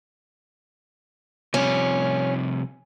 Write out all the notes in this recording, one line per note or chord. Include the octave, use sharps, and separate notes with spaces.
C3 F3 G3 C#4